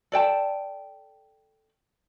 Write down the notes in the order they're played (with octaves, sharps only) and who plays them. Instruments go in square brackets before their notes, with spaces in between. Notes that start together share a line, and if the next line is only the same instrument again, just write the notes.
[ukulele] A4 D5 G5 A5